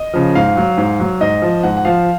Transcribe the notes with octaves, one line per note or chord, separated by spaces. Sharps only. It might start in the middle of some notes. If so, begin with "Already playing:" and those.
Already playing: D#5
C#3 F3
G#2 F5
F#3
G#2
F#3
G#2 D#5
F3
G#2 F#5
F#5
F3 F5